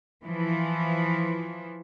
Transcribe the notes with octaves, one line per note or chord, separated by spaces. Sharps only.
E3 F3